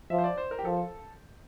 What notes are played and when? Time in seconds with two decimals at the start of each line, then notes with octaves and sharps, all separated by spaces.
0.10 F3 E5
0.18 C5
0.24 D5
0.38 C5
0.51 A#4
0.59 G4
0.65 F3 A4